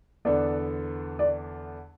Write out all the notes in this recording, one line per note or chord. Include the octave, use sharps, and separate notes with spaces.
E2 D3 B3 D4 A4 D5
D5